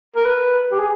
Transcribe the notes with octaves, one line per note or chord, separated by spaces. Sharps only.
A#4
B4
G4
G#4